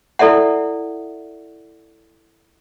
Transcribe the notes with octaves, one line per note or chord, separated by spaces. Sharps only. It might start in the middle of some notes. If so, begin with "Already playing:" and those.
E4 A4 D5 E5 F#5